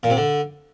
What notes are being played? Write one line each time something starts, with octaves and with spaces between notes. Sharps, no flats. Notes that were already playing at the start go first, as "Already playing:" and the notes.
A#2
C3
D3